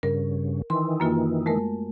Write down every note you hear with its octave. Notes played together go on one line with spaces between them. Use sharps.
G2 C#3 A#4
D#3 E3 C6
F#2 A#3 F4
G#3 A3 A#4